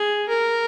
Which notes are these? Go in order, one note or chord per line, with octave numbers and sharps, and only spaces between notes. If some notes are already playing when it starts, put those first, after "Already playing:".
Already playing: G#4
A#4